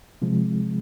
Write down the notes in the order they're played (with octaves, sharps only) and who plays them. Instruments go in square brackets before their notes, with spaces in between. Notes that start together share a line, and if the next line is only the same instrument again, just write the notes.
[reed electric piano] C3 F3 G#3